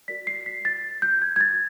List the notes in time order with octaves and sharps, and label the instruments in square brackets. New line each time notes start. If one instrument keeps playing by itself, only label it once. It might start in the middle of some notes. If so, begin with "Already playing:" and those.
[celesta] F#4 A#4 D5 B6
C7
B6
A6
G6
G#6
G#6
A6